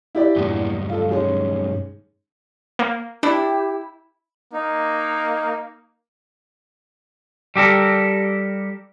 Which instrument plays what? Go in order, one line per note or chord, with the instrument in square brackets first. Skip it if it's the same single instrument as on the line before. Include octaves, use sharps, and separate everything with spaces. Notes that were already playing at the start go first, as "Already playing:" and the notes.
[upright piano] E4 G4 D5
[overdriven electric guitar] B1 G2 [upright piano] E2 A#2
[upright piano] F4 A4
D#3 G#3 C#4
[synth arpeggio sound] A#3
[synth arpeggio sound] D4 [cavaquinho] E4 [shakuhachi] G4
[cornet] A#3 [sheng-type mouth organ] D#4
[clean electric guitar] G3 G4 A4 A#4